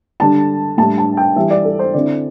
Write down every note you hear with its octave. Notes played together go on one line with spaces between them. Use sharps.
D3 G3 D4 A5
A2 G3 D4 A5
A5
G5
E3 G3 E4 E5
D5
A4
C5
D3 C4 E4 D5